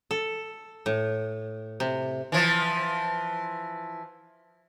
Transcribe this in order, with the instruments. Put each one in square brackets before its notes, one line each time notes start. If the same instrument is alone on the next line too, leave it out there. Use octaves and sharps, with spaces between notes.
[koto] A4
A2
C3
[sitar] E3 F3